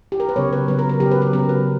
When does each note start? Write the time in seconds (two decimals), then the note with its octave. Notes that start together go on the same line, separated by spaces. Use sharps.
0.12 G4
0.20 A#4
0.29 B4
0.36 C#3 F#3 B3 C#5
0.53 B4
0.68 C#3 F#3 B3 B4
0.79 A#4
0.89 A#4
1.00 C#3 F#3 B3 G4
1.11 B4
1.22 B4
1.33 C#3 F#3 B3 A#4
1.49 B4